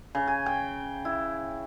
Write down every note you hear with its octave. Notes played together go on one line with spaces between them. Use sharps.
C#3
G#5
G5
E4